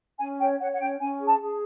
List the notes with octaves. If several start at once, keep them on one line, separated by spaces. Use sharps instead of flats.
C#4 G#5
C#5 G5
C#5 F#5
F#5
C#4 G5
C#4 G#5
G#4
A5
G#4